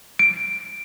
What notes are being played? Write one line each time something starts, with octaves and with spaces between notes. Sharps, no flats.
D7